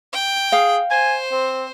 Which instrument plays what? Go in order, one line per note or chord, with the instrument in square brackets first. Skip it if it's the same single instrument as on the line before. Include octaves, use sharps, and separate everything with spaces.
[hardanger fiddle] G5
[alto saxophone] G#4 [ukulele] F5
[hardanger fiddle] C5 [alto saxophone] G#5
[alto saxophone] C4